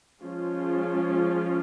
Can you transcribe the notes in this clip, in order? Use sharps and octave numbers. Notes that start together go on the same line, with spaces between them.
F3 G#3 C#4 F4